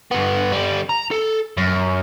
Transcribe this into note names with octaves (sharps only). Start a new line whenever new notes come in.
G2 B3
D3 G3
A#5
A4
F#2